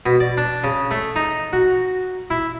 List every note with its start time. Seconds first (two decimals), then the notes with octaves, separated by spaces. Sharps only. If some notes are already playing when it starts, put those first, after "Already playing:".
0.06 B2
0.20 D5
0.38 D4
0.64 C#3
0.91 A3
1.16 D#4
1.53 F#4
2.30 E4